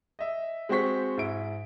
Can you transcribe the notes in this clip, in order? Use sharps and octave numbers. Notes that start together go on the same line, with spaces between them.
D#5 E5
G#3 C4 F#4 C5 C#6 B6
G#2 E4 D7